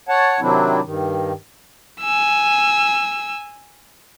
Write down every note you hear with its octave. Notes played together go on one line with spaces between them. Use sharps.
C#5 F#5 A5
C3 D#3 F#3 C4 D4 E4
G2 D#3
G#5 E6